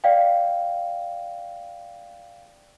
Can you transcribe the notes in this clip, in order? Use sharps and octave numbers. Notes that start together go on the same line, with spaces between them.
D5 F5 G5